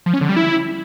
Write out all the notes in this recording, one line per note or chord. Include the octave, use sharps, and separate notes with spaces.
F3
C#4
D3
G3
E4